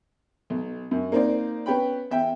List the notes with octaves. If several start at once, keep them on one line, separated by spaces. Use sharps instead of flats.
B1
F#2
A#3 C4 D#4 C5 D5
B3 C#4 G5 B5
E2 E5 G5